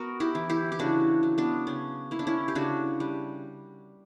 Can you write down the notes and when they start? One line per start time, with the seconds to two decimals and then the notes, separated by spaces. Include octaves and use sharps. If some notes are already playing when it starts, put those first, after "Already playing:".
Already playing: B3 F#4 A#4
0.20 E4 G4
0.35 E3
0.50 E4 G4
0.72 G4
0.79 C#3 D4 F#4
1.23 F#3
1.38 B3 D4
1.67 C#3 C#4
2.11 A#3 E4
2.19 D4
2.27 C#4 E4
2.48 G4
2.55 C#3 D4 F#4
3.00 G3